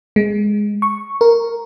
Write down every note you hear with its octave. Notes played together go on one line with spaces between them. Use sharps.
G#3
C#6
A#4